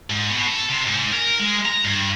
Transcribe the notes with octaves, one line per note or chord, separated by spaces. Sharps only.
G#2
B2
A4
C3
G#2
A#4
G#3
A#5
G2